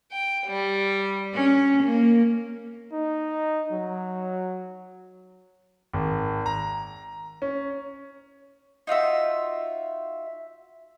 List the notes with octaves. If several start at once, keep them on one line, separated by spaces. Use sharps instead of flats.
G5
G3
C#4
A#3
D#4
F#3
G#1
A#5
C#4
D#4 F4 F#4 E5